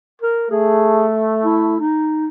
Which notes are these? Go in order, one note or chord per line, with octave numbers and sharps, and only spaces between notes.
A#4
A3 G#4
E4
D#4